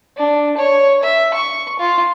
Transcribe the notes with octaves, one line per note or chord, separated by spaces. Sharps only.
D4
C#5
E5
C#6
F4